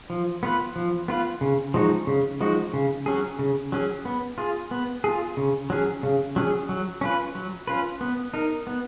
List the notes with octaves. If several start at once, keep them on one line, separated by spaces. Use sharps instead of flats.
F3
B3 F4 B4
F3
B3 F4 B4
C#3
F3 G#3 D#4 F#4
C#3
F3 G#3 D#4 F#4
C#3
F#3 C#4 G#4
C#3
F#3 C#4 G#4
B3
F4 G#4
B3
F4 G#4
C#3
F#3 C#4 G#4
C#3
F#3 C#4 G#4
F#3
C#4 F4 B4
F#3
C#4 F4 B4
B3
D#4 A#4
B3